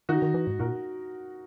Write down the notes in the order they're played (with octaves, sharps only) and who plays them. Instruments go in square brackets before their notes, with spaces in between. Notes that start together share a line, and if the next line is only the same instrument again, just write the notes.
[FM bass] D#3 [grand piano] D#4 F#4
[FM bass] D#3
E3
G#2
[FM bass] A#2 [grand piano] F#4 A#4